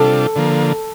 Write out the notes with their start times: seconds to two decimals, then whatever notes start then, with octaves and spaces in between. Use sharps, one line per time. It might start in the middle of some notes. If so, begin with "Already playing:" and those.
Already playing: C3 G3 D4 F4 A4
0.36 D3 F3 A#3